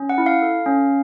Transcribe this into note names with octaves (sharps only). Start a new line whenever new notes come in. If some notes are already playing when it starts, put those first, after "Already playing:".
Already playing: C#4
F#5
E4
F5
A4
C#4